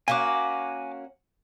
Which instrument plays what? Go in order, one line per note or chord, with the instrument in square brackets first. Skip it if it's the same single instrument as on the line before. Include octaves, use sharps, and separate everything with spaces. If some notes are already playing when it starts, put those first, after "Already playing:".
[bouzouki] A#3 C#4 F#4 [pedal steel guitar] G#5 D6